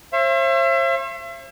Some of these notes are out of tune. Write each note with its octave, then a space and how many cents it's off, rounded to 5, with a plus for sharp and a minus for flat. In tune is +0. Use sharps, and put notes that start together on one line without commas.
C5 +45 E5 +40